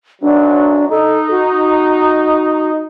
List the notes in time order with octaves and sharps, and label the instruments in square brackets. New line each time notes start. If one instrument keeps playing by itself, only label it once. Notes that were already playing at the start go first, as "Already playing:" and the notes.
[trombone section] B1 F#2 F#3 [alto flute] D4
[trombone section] D#4 [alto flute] A4
[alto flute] F#4